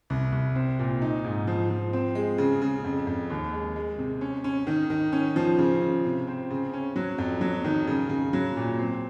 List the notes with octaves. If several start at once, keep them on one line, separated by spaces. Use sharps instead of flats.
C2
C2
C4
A#2
D#4
G#2
F3
F3
C4
G#3
C#3
C#3
F2
F2
D#2
G#3
G#3
C3
C#4
C#4
D#3
D#3
C#4
F3
C#3
C#3
C3
C4
C#3
C#4
F#3
F2
F#3
D#3
C#3
C#3
F#3
A#2
C4